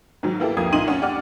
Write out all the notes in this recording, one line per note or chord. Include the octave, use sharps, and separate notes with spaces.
G#2 D#3 F#3
A#3 B3 E4 G4 A4
C2 F2 A#3 D#6 G#6
C2 A#2 D#4 C6 D#7 F#7
C#4 D4 F#5
G4 D5 F#5 D6 F6